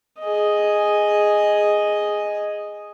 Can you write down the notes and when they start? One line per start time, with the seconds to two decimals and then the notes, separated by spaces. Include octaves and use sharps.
0.20 G#4 D#5